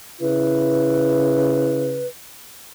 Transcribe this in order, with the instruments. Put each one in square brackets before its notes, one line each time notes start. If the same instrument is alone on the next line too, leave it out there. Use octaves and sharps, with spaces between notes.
[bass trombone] C#3 [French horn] E4 [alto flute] B4